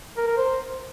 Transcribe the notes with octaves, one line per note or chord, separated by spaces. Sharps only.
A#4
A#4
C5